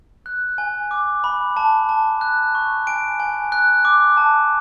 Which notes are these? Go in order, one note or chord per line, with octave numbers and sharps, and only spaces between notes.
F#6
G#5
D6
B5
A5
A5
F#6
C#6
G#5 D7
G#5
F#6
D6
A5